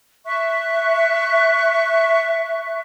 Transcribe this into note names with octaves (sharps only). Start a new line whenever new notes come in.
E5 C#6 F#6